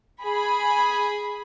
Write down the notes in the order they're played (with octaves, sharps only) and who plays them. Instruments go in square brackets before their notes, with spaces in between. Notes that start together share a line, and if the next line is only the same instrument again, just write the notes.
[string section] G#4 B5